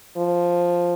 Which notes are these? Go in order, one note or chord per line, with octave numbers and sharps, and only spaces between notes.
F3